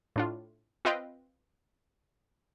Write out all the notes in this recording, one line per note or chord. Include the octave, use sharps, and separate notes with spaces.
A2 D4 F4
C4 F4 B4 D#5 F5 G5